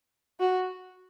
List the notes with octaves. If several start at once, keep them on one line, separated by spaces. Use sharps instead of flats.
F#4